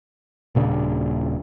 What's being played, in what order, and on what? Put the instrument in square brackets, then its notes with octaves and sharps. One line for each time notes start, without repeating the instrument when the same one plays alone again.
[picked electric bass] D#1 A#2 C#3 D4